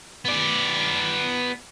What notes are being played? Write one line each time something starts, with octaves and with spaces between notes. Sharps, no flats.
B3 D5